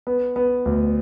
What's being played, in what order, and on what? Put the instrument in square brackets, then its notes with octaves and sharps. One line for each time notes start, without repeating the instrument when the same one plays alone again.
[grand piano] B3
B3
D2